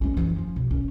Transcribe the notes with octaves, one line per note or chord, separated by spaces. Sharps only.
G#3 C#4
F#2 E3
F3 C#4
B2
C#4